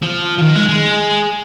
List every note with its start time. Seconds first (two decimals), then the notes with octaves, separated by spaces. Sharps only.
0.02 F3
0.38 F3
0.42 D#3
0.56 G#3
0.69 G#3